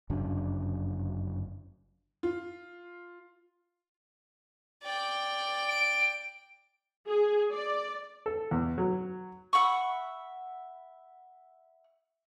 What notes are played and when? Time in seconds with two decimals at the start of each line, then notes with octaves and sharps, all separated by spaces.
0.10 G1 F#2 C#3 D4
2.23 F4
4.83 D5 G5
5.69 D7
7.07 G#4
7.53 D5
8.26 A4
8.51 E2
8.78 F#3
9.53 E5 F#5 B5 C#6